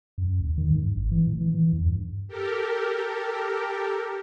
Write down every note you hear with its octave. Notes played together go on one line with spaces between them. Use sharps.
F#2
D#2
D#3
G#2
G2
G#1
E3
A2
E3
E3
E2
G2
G4 A4 A#4